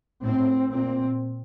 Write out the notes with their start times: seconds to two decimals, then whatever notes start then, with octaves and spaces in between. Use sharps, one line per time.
0.22 A2 C4
0.70 A#2 C4